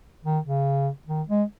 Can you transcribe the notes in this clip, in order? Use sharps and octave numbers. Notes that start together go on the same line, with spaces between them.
D#3
C#3
D#3
G#3